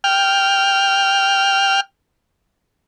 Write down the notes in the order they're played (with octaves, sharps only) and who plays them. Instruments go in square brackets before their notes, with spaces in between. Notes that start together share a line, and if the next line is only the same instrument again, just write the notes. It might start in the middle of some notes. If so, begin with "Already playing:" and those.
[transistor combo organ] G5 F6